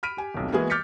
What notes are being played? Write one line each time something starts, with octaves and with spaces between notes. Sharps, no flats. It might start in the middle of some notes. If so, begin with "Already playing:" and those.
B5 F6 B6 D7 D#7
G4 G#5
D#1 B1 C3
E3 G#3 A#3 B3 F#4 G#4
D6 F6 G6 A6 B6 C#7